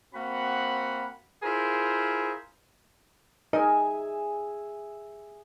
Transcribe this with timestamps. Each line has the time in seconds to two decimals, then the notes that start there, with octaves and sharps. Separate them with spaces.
0.13 A#3 C4 F#4 F#5 B5
1.43 E4 F4 G#4 A#4 C5
3.53 D#4 G#4 A#4 D#5 E5 G#5